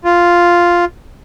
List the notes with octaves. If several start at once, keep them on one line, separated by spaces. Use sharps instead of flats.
F4